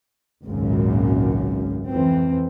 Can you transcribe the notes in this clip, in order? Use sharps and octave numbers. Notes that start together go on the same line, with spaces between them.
G#1 C#2 F#2 A#2 C#3
F2 E3 C4